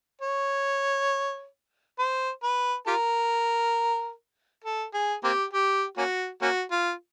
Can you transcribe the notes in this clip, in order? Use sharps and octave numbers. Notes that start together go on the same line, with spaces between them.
C#5
C5
B4
F4 G4 A#4
A4
G#4
A#3 C4 G4
G4
A#3 C#4 F#4
A#3 C#4 F#4
F4